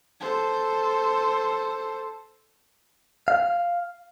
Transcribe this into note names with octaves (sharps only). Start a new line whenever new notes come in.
A4 C5
F5